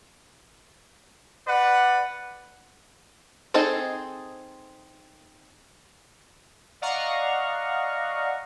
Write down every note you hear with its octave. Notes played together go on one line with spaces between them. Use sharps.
B4 D5 F#5
C4 D#4 G#4 A4 C5
D5 D#5 F5 F#5 A#5 C#6